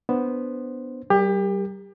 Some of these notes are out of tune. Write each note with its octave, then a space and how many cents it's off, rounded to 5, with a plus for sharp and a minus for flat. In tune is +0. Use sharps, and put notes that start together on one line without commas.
B3 +0 D4 +0 C5 +0
G3 -30 G4 +30 A#4 +0